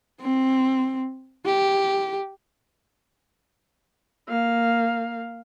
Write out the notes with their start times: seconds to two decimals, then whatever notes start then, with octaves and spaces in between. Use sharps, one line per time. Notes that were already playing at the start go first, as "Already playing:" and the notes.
0.21 C4
1.45 G4
4.28 A#3 F5